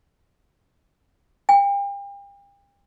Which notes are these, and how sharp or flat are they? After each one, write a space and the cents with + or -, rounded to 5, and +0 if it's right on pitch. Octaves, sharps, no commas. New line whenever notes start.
G5 +40